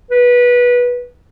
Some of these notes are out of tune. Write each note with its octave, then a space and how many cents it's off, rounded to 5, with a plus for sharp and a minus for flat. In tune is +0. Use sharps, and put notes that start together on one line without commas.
B4 -20